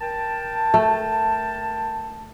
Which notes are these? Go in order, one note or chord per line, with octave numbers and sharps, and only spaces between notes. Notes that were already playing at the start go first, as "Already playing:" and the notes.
A#4 G5 A5
A3